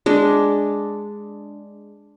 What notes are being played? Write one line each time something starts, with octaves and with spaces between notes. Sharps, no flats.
G#3 D4